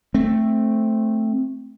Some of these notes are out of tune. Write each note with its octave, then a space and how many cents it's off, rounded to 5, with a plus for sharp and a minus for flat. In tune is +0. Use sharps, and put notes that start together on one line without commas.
A3 +0 C4 +10